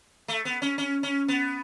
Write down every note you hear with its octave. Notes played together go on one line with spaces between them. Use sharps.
A3
B3
C#4
C#4
C#4
B3